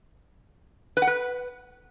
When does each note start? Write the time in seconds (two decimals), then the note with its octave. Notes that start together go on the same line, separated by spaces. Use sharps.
0.97 B4
1.02 F#5
1.07 B4